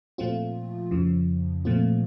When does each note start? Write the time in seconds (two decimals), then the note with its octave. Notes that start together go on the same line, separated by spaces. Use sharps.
0.18 A#2 F3 A3 C4 F4
0.91 F2 C#3 F3
1.65 A#2 F3 A3 C4 F4